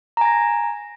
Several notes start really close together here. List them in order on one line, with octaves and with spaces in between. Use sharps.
A#5 G#5 A#6